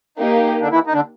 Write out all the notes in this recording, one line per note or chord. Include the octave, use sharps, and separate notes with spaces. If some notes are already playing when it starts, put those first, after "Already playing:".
A#3 D#4 G4
D3 D4
E3 E4
D#4
D3 D4